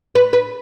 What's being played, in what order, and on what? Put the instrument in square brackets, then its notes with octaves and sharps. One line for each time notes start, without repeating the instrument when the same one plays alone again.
[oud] B4
B4